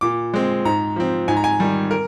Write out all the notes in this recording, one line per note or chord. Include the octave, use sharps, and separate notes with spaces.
A#2 D6
G#3 C4
G#2 A#5
F3 C4
G#2 G#5
A#5
G#5
D#3 G3
A#4